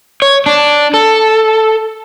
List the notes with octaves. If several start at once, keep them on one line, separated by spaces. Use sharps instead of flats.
C#5
D4
A4